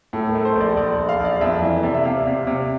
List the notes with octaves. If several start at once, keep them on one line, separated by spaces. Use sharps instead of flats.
A2 A4
A#4
A3
C5
A#1 D5
A#1 D5
A#1
F5
A#1 D5
F2 E5
E3
C3 D5
E5
C3 F5
C3
C3